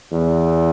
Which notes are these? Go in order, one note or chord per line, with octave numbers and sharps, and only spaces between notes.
E2